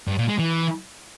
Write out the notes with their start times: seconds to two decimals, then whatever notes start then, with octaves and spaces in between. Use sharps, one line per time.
0.08 G2
0.18 A#2
0.28 G#3
0.39 E3